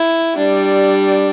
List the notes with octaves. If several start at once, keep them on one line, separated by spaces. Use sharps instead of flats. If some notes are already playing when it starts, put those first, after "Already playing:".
Already playing: E4
G3 D4